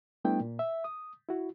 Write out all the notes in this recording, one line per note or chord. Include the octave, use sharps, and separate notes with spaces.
G3 A3 B3 D4 E4 G5
A#2
E5
D#6
E4 F#4